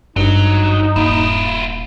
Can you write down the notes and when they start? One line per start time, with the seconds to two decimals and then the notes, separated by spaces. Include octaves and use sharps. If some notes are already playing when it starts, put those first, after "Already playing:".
0.16 G#1 G2 F#3 D#4
0.96 D#1 E4 F4